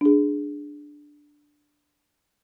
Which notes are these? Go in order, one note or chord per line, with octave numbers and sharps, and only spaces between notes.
D4 G#4